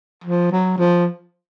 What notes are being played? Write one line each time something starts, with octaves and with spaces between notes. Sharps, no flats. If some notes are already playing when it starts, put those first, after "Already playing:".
F3
F#3
F3